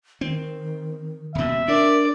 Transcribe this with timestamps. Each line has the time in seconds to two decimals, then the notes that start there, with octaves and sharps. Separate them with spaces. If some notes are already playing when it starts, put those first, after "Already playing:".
0.21 D#3 C4
1.35 D#1 B2 C4 E5
1.68 D4 A#4 D5